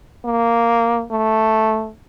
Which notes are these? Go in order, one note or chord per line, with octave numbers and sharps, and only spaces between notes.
A#3
A3